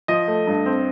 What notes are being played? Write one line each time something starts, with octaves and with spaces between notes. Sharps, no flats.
F3 D#5
A3
G2
C4